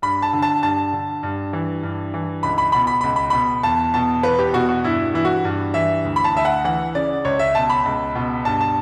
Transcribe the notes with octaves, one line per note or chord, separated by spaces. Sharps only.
G2 B5
A5
D3
A5
G2 A5
D3
G2
E3
G2
E3
C#2 B5
B5
B2 B5
B5
B5
C#2
B5
B2 B5
E2 A5
B2 A5
E2 B4
G4
B2 F#4
F#4
G2 E4
E3 E4
F#4
G2
E3 E5
D2
B5
A5
D2 E5
F#5
E3 F#5
C#3 D5
C#2 C#5
E5
B2 A5
B5
C#2
B2
G2 A5
A5